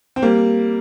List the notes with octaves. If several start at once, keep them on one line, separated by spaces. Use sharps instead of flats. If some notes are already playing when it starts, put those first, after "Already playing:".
C4
G3 A#3